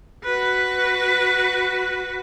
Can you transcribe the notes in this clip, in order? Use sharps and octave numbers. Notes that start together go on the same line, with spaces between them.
F#4 B4